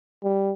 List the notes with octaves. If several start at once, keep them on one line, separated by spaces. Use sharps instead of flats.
G3